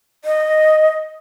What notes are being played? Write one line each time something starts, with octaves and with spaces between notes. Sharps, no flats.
D#5